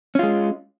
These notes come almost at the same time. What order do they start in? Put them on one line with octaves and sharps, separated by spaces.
C#4 F4 G#3